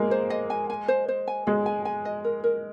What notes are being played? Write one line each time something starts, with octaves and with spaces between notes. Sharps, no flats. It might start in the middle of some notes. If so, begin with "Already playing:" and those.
Already playing: G#3 A#3
C5
D#5
G#5
G#5
C5
C5
G#5
G#3 G#4
G#5
G#5
D#5
A#4
A#4